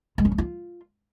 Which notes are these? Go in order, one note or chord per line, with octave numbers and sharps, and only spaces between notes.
G#3
C#4
G#3
F4